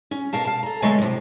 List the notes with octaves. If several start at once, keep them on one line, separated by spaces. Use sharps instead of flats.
C#4
B2 A#4 F5 A5
F5 A5
A4 A#5
B2 D3 F#3 G#3 A3
A2 C3